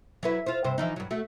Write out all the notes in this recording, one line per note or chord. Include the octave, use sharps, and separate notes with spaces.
F#3 E4 B4
F4 C5
G2 C3 C5
E3 F3 D#4
G2 F#3
A3 F#4